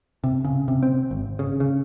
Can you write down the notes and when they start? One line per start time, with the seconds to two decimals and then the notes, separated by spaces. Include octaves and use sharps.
0.24 C3
0.45 C#3
0.68 C3
0.83 C4
1.11 G#1
1.39 C#3
1.60 C#3